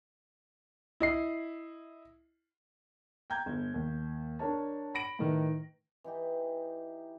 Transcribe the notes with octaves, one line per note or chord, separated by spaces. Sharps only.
E4 D#5 C7
G5 A#5 G6 G#6
G1
D#2
D4 A#4 C#5 A5
B5 A#6 D7 F#7
A2 D#3 D#4 B4
E3 D#4 G4